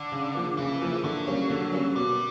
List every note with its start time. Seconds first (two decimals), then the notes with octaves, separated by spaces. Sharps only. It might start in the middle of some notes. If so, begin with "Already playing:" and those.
Already playing: D3
0.12 C#3
0.35 F3 A#3
0.57 C#3 E3
0.81 F3 A#3
1.03 D3 F#3
1.27 G3 A#3 C#4
1.50 D3
1.72 G3 A#3 C#4
1.95 B2 G3